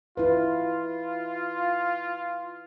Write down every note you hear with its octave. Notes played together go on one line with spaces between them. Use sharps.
E4 F4 B4